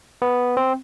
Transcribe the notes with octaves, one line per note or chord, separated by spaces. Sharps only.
B3
C4